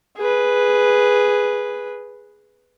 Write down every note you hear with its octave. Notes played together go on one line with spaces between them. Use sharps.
G#4 B4